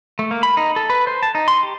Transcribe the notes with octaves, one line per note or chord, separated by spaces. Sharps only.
A3
A#3
B5
D#4
A4
B4
C5
A5
D#4
C6
G4